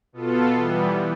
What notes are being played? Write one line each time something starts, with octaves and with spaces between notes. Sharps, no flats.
B2 B3 F4 A4
E3 G3 B3